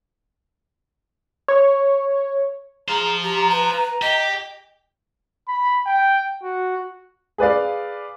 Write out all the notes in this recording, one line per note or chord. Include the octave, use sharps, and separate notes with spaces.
C#5
G#4 C5 F5 A#5
G4
B4
G4 D#5
B5
G5
F#4
G#4 B4 D5 F5